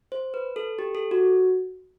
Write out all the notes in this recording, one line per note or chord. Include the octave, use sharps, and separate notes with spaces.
C5
B4
A4
G4
A4
F#4